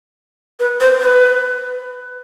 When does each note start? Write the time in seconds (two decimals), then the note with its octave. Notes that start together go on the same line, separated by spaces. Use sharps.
0.60 B4
0.80 C5
1.01 B4